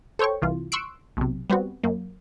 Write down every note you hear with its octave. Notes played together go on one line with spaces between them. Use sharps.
A4 C5 C#5 G5 C#6
C2 E3 F4
C6 C#6 E6 F#6 C7 D7
B1 C3
G3 B3 C4 F#4
F#2 A#3